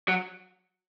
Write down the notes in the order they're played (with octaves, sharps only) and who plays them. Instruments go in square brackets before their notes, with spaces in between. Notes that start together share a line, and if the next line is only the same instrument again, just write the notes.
[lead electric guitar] F#3